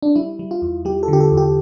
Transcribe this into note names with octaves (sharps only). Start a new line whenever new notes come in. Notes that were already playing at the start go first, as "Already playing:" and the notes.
D4
G3 E4
G3
F4
E2
G3 G4
A4
D3 G4
A4
E2
G4